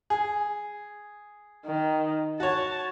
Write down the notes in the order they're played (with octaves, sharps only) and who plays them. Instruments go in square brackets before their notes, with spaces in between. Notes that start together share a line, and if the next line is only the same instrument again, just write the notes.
[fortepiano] G#4
[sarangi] D#3
[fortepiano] F#4 C#5 [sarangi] A5